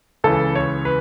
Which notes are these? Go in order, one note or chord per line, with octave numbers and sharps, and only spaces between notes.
C#2 C#3 E3 A4
C#5
B4